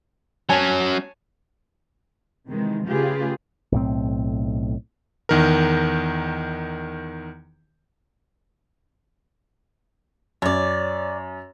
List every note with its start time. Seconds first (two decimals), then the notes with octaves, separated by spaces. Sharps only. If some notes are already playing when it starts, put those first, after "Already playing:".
0.49 F#3 C#4 C#5 G#5 A5
2.47 C3 D#3 E3 G#3
2.87 C#3 A3 F4 G4 G#4 B4
3.72 B1 A2 C4
5.29 E2 D#3 A#4
10.42 F#2 C#5 D5